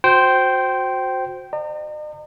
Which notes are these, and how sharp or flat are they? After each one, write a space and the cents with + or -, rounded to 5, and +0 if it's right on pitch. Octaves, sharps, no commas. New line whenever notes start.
F#4 -20 C5 +0 G5 -20
D#5 -45 A#5 -35